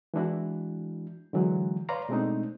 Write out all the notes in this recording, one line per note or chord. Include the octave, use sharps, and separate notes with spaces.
E3 G#3 D4 E4 F#4
D3 E3 F#3 G#3
B4 C#5 D5 F5 A#5 C6
B2 G#3 A3 C4 D4 D#4